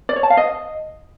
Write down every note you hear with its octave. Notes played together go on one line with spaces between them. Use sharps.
D5
C#5
A5
F5
D#5